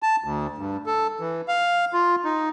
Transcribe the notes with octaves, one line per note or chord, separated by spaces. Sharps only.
A5
D2
G2
A4
E3
F5
F4
D#4